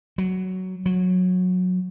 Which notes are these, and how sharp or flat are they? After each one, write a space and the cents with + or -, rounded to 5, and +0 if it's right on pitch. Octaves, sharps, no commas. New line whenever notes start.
F#3 +10
F#3 -20